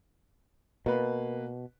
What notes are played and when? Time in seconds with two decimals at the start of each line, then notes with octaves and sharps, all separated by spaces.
0.86 B2 A#3 B4